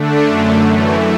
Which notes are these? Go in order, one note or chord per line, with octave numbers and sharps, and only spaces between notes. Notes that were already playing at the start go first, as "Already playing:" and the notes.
Already playing: D3 A3 D4
F#2 D3 A3
F#2 E3 A3